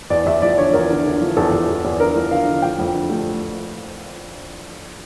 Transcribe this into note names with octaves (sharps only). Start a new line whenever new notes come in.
E2 D5
E2 E5
F3 D5
D3 C#5
E2 A#4
D3
D3
F3
E2 A4
E2
E2
E2
D3 A#4
F3
D3 F5
D3
F2 G5
F2
D3
A3